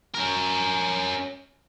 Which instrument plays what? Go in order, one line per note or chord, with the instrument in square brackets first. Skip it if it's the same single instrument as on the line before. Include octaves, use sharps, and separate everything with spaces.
[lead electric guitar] C#4 A#4